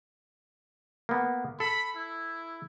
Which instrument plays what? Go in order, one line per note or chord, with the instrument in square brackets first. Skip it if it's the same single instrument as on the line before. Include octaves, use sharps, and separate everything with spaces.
[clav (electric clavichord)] A#3 B3
[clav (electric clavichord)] A4 [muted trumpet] B5
[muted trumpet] E4